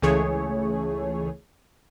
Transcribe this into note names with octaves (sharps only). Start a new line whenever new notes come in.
C#2 C#3 E3 A3 G#4 C#5